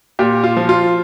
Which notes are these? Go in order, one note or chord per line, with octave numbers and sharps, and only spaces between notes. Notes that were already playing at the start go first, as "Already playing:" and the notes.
A#2 G4
F4
F3
F4